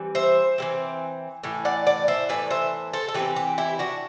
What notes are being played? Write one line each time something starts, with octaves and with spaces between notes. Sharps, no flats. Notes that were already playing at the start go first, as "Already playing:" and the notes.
Already playing: E3 G3 C4
C5 E5
E3 G3 C4
A2 E3
D5 F#5
D5 F#5
C5 E5
A2 E3 B3 B4 D5
C5 E5
A4 C5
A4
E3 A3 C4 G4 B4
G4 B4
E4 G4
D4 F#4